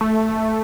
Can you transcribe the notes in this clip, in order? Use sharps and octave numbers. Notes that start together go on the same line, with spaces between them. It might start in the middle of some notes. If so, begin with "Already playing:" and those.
A3